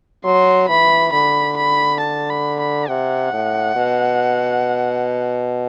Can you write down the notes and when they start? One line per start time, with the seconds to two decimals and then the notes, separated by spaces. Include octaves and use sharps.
0.24 F#3 C6
0.69 E3 B5
1.13 D3 B5
1.57 B5
2.00 A5
2.30 B5
2.60 B5
2.88 C3 F#5
3.33 A2
3.76 B2